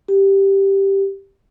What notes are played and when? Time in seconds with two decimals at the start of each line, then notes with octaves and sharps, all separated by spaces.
0.08 G4